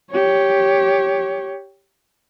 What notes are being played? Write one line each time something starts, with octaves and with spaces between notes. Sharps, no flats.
G4 C#5